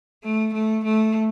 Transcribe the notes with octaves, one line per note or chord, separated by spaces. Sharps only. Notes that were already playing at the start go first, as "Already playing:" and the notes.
A3
A3
A3